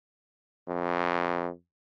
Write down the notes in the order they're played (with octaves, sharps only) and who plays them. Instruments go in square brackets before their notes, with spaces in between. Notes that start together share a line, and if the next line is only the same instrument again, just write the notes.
[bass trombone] F2